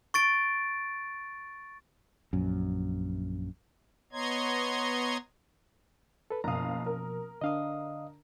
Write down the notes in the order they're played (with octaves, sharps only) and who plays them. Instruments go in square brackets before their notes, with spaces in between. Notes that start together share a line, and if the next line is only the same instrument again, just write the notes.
[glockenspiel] C#6 A6 D7
[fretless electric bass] A#1 F#2
[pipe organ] B3 C#5 D#5 A#5 C6 G#6
[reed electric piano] A4 B4
[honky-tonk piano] F#1 F5 [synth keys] B2 F3 [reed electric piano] A#5 D#6
[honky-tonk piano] A#4
[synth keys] D3 D4 [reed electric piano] D#5 F5 D#6